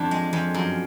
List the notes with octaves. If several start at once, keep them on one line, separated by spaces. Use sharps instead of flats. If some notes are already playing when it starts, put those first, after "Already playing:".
Already playing: F2 D4
G#3
F2
F#2